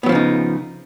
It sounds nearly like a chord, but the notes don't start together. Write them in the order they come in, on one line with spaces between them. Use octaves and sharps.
B3 F#3 F3 C#3 D#4